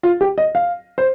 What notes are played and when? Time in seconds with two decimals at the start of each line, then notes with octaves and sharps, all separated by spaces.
0.03 F4
0.21 G4
0.38 D#5
0.55 F5
0.98 C5